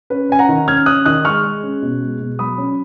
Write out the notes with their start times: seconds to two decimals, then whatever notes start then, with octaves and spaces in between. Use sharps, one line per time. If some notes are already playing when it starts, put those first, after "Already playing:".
0.10 C#4 B4
0.29 C#4 G#5
0.39 F#5 A#5
0.49 D#3
0.68 C#4 F6 G#6
0.86 C#4 D#6 F#6
1.06 D#3 D#6 F#6
1.25 G#3 C#6 F6
1.43 G#3
1.63 C#4
1.82 B2
2.01 G#3
2.20 B2
2.39 F#3 B5 D#6
2.58 C#4